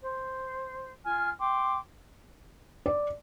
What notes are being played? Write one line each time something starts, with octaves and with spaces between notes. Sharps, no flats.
C5
F4 G#5 F6
G5 C6 D6
D5